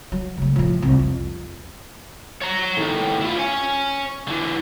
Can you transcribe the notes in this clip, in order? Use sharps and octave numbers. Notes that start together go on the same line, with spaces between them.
F#3
C#3 A3
A2 F3
C2
F2
C#5 A#5
A2 D#3
E4 F4
C#5 G#5
D3 E3